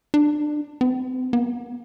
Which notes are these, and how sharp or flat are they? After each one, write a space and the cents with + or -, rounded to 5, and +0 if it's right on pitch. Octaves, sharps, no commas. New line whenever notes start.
D4 +25
C4 -40
B3 -35